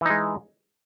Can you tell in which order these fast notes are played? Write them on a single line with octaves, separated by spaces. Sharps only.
E3 D#4 G#3